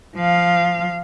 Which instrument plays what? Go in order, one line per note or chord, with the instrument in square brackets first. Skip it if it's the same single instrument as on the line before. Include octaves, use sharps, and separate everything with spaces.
[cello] F3 F5